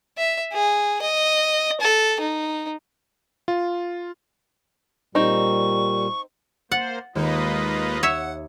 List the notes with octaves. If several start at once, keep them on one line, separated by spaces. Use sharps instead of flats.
E5
G#4
D#5
A4
D#4
F4
A#2 G3 C4 D#4 C#6
A#3 C5 F#5 A6
D#2 G#3 A#3 D#4 F4 B4 D#5
C#5 E5 F#5